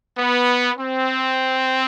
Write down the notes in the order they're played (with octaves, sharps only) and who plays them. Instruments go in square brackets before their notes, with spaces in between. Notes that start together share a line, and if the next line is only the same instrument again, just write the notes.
[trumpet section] B3
C4